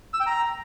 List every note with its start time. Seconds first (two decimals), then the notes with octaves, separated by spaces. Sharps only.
0.14 E6
0.20 G5
0.26 A#5